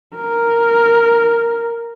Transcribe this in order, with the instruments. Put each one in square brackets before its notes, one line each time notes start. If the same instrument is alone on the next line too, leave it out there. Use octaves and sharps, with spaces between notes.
[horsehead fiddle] A#4